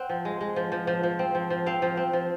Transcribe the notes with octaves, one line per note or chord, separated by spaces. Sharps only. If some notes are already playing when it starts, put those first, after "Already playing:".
Already playing: C4 F#5
F3
G#3
G#3
F3
F3
F3
F3
C4
F3
F3
C4 F5
F3
C4
F3